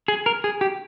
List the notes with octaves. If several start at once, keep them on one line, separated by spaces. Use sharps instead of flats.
G#4
A#4
G#4
G4